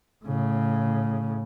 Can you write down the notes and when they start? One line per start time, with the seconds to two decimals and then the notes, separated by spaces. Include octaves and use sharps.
0.25 A2 C#3